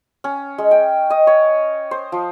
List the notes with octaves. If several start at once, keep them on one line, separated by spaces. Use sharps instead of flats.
C#4
G#3
G5
D#5
C#5
C5
F3